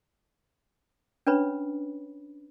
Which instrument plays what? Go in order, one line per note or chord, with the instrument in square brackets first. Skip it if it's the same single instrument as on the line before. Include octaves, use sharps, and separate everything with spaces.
[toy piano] C#4 D4 B4 C#5 B5